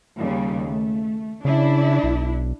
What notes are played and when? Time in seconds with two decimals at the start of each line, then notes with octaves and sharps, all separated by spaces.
0.18 D#2 C#3 G3
0.69 A3
1.45 C#3 D4 E4
2.03 B1